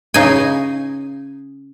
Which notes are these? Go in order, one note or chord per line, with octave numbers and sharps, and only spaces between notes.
C#3 D#4 G#5